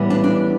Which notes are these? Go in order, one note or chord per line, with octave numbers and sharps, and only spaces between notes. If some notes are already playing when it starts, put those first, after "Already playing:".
Already playing: A2 E3 G3 B3
D4
D4